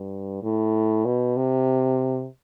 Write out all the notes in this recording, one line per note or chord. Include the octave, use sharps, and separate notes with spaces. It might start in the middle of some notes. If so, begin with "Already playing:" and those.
Already playing: G2
A2
B2
C3